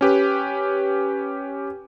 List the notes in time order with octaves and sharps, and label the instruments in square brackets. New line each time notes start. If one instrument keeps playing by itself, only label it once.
[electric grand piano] C#4 G4 B4